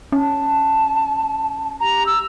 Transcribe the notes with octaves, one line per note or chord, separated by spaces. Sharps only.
C#4 A5
G4 A#5
E6